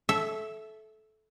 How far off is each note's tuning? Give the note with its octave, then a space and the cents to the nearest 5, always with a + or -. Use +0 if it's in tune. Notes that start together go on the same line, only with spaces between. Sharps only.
A4 -20 E5 +0